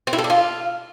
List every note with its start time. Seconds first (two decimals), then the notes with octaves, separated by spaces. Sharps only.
0.07 C4
0.13 E4
0.18 A4
0.24 D4
0.30 F4